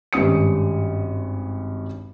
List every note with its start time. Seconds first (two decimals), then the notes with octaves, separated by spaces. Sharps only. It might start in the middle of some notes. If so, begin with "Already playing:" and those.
0.13 G#1 G2 C#4 D#6 C#7